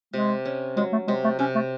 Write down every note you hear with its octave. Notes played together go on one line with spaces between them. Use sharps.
C3 G#3
C#4
F#3 G#3
A3
C3 G#3
A3
C3 C#4
A3